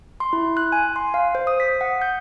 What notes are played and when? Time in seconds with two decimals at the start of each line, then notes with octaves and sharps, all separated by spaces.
0.20 C6
0.33 E4
0.57 F#6
0.72 G#5
0.96 C6
1.14 F5
1.35 C5
1.47 D#6
1.60 B6
1.81 F#5
2.02 G6